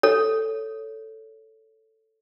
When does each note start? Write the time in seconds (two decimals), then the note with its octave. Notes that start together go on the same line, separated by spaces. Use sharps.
0.03 A4 C#5